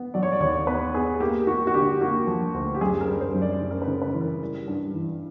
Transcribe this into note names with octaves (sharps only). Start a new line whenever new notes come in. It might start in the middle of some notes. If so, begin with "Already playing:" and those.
Already playing: B3
F#3 D5
C#5
D5
D#2 C#5
B3 B4
B3 G#4
A#3 G4
A#3 F#4
F#4
D3 G4
A#3 F#4
F3
D2
G4
F#2 G#4
A#4
G3
C5
F#2
D5
C#3
A#4
B4
C#3
B4
E3
A#4
G3
G2
E3